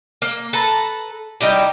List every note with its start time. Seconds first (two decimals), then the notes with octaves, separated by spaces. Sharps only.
0.22 A#3
0.53 A4 B4 A5 A#5
1.41 G3 D#4 E4 G4